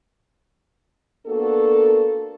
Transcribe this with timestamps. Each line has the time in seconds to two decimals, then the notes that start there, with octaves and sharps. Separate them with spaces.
1.26 A#3 B3 D4 F#4 A4